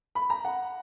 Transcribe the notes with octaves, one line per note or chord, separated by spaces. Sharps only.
B5
A#5
F#5